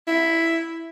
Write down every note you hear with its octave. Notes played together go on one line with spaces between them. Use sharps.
E4